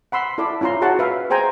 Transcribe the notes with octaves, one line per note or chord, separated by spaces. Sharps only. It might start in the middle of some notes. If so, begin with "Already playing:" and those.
F#5 B5 C6 E6
E4 A4 D5 B5 D6
C#4 E4 F4 A#5 C6
F#4 G#4 C#5 F#5 A5
B4 E5 F5
G#4 C5 G5 G#5 A#5